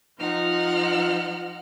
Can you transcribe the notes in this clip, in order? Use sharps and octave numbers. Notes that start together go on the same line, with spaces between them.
F3 D#4 F4 F#5 F6